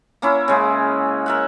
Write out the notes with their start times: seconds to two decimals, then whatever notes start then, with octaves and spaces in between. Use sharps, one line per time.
0.22 A#3 C#4 E4
0.48 C#3 G#3
1.26 A#4 E5 F#5